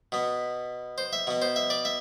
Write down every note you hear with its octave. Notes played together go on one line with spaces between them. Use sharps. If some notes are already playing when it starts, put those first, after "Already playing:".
B2 B3
C5
E5
B2 B3
C5
E5
D5
E5